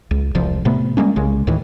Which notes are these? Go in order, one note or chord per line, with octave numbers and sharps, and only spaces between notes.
C#2
E1 C2 F3
A2 C3 A3 B3
G3 G#3 A#3 C#4
C2 C#3 G#3
D2 A2 D#3 E3